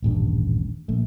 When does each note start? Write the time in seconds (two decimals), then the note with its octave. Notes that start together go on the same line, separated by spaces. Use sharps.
0.02 D#1 A1 G2
0.88 A#1 A3